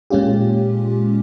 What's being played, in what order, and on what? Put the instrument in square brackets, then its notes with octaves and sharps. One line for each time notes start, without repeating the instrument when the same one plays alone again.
[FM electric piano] A#2 G#3 C#4 F4 G4